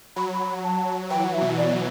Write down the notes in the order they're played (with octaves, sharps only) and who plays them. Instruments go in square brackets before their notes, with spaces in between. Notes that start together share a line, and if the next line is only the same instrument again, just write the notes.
[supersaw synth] F#3 [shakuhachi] B5
[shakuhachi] B5
A5
[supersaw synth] E3 [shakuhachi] G5
[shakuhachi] F#5
E5
[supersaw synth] B2
[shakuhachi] D5